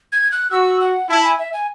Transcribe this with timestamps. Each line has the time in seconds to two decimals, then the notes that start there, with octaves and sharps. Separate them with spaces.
0.12 G#6
0.32 F#6
0.51 F#4 E6
0.81 F#5
1.10 E4 A5
1.24 G#5
1.39 E5
1.53 G#5